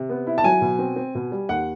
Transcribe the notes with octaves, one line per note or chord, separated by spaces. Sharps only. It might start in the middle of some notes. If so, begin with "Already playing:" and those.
Already playing: C3
B3
E4
A5
F#3 G#5
B2
C4
C4
B2
G3
D#2 F#5